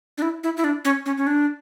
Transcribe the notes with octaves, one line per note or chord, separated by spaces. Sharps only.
D4
E4
E4
E4
D4
C#4
C#4
C#4
D4